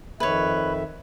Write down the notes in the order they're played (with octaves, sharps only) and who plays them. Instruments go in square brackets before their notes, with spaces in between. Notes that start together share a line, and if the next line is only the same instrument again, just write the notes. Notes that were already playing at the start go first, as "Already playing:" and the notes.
[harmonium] F2 D#3 E5 [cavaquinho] B4 C#5